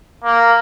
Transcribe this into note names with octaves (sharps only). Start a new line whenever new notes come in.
A#3